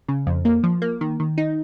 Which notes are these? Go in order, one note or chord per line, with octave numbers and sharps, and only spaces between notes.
C#3
F2
A#3
F3
A#3
D#3
D#3
D#4